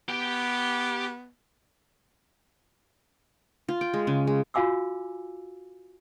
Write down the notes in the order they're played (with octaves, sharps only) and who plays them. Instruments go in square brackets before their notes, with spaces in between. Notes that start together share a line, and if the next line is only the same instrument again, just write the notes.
[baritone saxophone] B3 [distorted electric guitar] G4 G5
[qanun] F4
G5
G#3
C#3
G#3
[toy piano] F4 F#4 F5 G#5 D6 E6